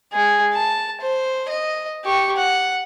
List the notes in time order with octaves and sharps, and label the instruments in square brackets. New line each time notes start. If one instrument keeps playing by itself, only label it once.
[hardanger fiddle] G#3 G#4
A5
C5
D#5
G4 C#6
F#5